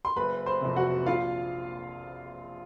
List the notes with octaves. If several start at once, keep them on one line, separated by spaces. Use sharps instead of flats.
C6
F#1 B4 B5
C5 C6
F2 C3
F#4 F#5
A#1 F4 F5